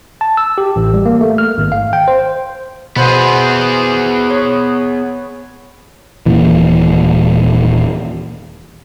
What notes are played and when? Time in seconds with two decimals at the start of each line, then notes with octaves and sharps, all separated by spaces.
0.21 A5
0.37 E6
0.58 G4
0.76 A1
0.94 G3
1.06 A#3
1.21 A3
1.38 F6
1.58 G#1
1.72 F5
1.93 G5
2.08 C5
2.96 B2 B3 G#4 B4 C5 F#5
4.30 C#5
6.26 D#1 A#2 E3